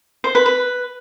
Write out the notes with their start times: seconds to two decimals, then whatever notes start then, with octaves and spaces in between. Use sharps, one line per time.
0.24 C5
0.35 B4
0.46 B4